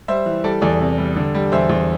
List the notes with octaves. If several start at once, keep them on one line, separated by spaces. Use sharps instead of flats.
G3 C5 E5
E3
G3 A4 D5
E2 A4 D5
C3
G3
D3
G3
E2 C5 E5
E2